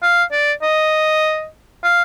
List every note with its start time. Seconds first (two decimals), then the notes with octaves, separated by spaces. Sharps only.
0.03 F5
0.32 D5
0.62 D#5
1.83 F5